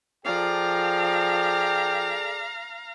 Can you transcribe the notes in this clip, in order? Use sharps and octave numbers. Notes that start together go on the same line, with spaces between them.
F3 G#4 A4 D5 F5 G5 A#5